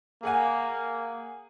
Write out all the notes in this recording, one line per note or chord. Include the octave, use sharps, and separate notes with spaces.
A#3 G#4 F#5 G#5